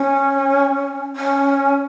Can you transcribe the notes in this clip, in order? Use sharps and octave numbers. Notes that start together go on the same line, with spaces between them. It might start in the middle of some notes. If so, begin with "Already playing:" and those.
Already playing: C#4
C#4